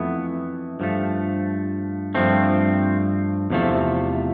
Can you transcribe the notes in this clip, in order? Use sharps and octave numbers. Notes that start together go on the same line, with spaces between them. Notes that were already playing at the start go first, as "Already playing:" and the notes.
Already playing: F2 E3 A3 B3
G2 F3 A3
G2 F3 A3 C4
E2 C3 F3 A3